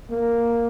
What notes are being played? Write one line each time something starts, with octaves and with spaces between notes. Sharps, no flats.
A#3